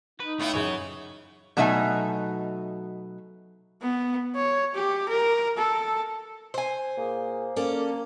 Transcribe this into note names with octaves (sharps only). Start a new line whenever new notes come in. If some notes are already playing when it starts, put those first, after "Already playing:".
D#4 B4
A2 A3 B3 E4 F4
F#2 C#3 E3 C#5
B2 F#3 A3 D#4 E5 G#5
B3
C#5
G4
A#4
A4
C5 G#5
A#2 A#3 G#4
A#3 C#4 A4 D5